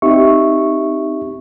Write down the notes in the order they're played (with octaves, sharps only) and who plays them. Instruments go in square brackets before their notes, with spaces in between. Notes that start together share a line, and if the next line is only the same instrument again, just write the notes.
[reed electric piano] C4 D#4 G4 E5 C#6